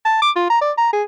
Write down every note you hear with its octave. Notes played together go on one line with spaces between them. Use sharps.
A5
D6
F4
A#5
D5
A#5
G#4